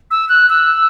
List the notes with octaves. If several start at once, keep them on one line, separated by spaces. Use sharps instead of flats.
E6
F#6
E6